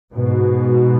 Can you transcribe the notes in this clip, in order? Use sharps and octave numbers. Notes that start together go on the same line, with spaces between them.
G#2 B2